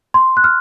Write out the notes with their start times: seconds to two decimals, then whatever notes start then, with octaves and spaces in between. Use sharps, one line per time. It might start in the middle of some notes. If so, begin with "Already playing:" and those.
0.14 C6
0.37 F#6
0.44 F6